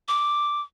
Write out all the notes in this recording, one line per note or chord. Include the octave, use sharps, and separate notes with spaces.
D6